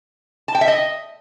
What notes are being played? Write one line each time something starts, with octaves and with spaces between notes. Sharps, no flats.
A5
G5
E5
D#5